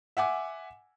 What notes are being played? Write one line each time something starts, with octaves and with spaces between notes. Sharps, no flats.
E5 F#5 G#5 D6